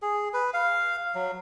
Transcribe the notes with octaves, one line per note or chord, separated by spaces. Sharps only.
G#4
B4
F5
F#3